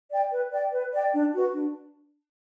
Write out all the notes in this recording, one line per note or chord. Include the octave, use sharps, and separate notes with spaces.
D5 G5
B4
D5 G5
B4
D5 G5
D4
F#4 B4
D4